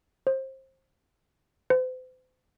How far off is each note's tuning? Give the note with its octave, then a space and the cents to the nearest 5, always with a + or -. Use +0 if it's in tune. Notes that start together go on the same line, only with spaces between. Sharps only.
C5 +25
C5 -40